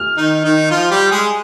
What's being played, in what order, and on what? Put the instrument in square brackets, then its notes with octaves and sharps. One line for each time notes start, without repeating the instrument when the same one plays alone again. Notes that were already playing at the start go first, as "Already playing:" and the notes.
Already playing: [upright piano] F6
[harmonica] D#3 D#4
D#3 D#4
F3 F4
G3 G4
G#3 G#4